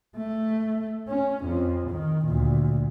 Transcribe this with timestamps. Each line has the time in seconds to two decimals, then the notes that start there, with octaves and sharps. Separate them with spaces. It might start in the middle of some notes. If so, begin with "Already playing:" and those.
0.17 A3
1.07 C#4
1.45 F2
1.90 D#3
2.25 D2 A#2